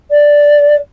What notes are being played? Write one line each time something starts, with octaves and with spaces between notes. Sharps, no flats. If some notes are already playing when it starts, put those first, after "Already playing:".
D5